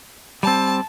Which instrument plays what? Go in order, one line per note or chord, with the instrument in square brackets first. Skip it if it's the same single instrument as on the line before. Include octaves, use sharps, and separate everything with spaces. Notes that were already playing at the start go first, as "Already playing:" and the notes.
[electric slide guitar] G3 C4 [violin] A5